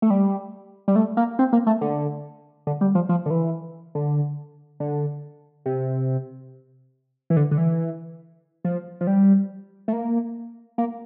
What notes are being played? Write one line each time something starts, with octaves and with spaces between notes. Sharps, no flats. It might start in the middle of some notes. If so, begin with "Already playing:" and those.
A3
G3
G3
A3
A#3
C4
A#3
A3
D3
D3
G3
F3
F3
D3
E3
D3
D3
C3
E3
D3
D3
E3
F3
F3
G3
A3
A#3
A#3